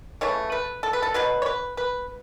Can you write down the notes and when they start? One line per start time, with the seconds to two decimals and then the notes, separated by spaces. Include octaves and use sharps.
0.21 C#3 E3 A3 C#5
0.52 B4
0.83 A4
0.93 B4
1.02 A4
1.14 B2 F#3 B4
1.42 C#5
1.46 B4
1.77 B4